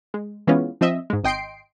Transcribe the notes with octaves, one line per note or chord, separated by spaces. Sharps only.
G#3
E3 G#3 B3 C#4 F4
F3 C4 D#5 E5
G#2 G#3
G#1 D#5 G5 C6 C7 D7